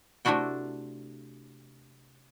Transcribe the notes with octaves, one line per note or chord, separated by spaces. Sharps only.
C3 A3 D4 E4 F#4 G5